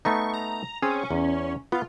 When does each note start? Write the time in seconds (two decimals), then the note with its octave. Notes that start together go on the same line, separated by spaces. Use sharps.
0.05 A3 B3 D#4 C#6
0.34 A#5
0.82 C4 C#4 G#4
1.11 E2
1.72 B3 F4